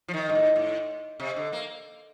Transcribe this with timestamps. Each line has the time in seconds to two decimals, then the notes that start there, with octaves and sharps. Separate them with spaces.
0.08 F3
0.14 D#3
0.30 G2
0.35 A2
0.56 A2
1.20 C3
1.36 D3
1.53 A#3